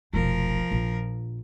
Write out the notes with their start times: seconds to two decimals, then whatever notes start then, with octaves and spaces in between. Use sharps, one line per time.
0.13 F1 B1 F3 A#4
0.71 A#1